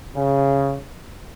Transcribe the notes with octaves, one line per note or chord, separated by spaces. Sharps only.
C#3